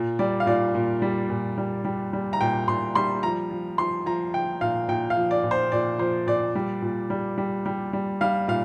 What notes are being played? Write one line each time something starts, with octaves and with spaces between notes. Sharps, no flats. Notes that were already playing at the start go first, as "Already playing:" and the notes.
Already playing: A#2
G3 D5
F5
A#2 D5
A#2
G3
A#2
G3
G3
G3
A#5
A#2 G5
A#2 C6
G3 C6
F3 A#5
F3
F3 C6
F3 A#5
F3 G5
A#2 F5
A#2 G5
F5
F3
D5
A#2
C5
A#2 D5
F3 C5
A#2 D5
G3
A#2
G3
G3
G3
G3
G3 F5
A#2 F5